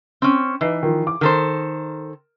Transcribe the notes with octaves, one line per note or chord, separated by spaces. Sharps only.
C4 C#4
E3 D#4 B4 C7
D#3 F3
D6
D#3 A4 A#4 C5